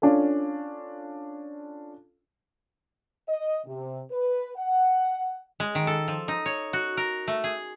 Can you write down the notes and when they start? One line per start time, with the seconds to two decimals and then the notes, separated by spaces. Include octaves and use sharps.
0.02 C#4 D4 F4 A4
3.29 D#5
3.66 C3
4.11 B4
4.57 F#5
5.60 G#3
5.75 D#3
5.87 A4
6.08 F3
6.28 D#4
6.46 C#5
6.73 F#4
6.97 A#4
7.28 A3
7.44 G#4